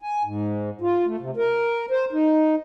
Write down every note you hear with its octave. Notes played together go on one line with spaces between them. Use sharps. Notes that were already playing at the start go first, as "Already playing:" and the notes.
G#5
G#2
F4
A3
C3
A#4
C5
D#4